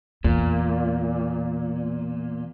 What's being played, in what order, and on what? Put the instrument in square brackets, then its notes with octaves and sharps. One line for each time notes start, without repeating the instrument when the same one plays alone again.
[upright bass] E2 [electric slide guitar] A#2